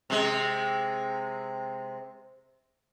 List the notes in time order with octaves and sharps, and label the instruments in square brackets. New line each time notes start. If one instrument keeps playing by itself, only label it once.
[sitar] C3 G#3